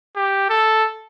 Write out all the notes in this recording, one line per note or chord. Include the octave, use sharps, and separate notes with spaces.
G4
A4